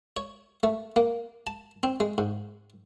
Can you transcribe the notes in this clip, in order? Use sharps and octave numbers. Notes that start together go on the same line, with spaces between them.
C#5
A3
A#3
A5
C4
G#3
G#2